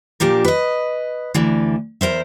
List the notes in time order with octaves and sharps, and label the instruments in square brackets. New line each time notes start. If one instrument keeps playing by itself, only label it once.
[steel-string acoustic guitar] A#2 F3 D4 G4 A#4
B4 D#5
D2 D3 E3
E2 A#4 C5 E5